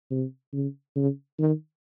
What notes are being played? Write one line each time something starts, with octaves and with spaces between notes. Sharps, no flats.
C3
C#3
C#3
D#3